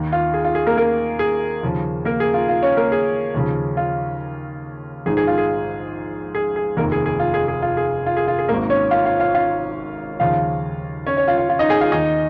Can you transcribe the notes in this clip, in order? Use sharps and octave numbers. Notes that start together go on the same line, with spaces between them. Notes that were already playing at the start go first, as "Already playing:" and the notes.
Already playing: D#2 D#3
F4
G#4
F4
G#4
A#3 A#4
A#3 A#4
G#4
D#2 C#3 F3
A#3 A#4
G#4
F4
F4
C#4 C#5
A#3 A#4
G#4
D#2 C#3 F3
F4
A#1 G#2 D#3 G#4
G#4
F4
G#4
G#4
G#4
F1 D#2 D#3 A#3 A#4
G#4
G#4
F4
G#4
G#4
F4
G#4
F4
G#4
F4
G#4
G#1 G#2 D#3 A#3 A#4
C#4 C#5
F4 F5
F4 F5
F4 F5
F4 F5
D#2 C#3 F3 F4 F5
C#4 C#5
C#4 C#5
F4 F5
F4 F5
F4 F5
D#4 D#5
G#4 G#5
F4 F5
D#2 D#3 D#4 D#5